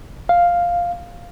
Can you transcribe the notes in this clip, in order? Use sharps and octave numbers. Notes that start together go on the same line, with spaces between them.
F5